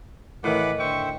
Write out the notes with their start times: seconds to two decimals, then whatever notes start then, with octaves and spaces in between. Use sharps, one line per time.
0.44 A2 D#3 E3 B4 F#5 D6
0.79 D3 C5 E5 G5 C#6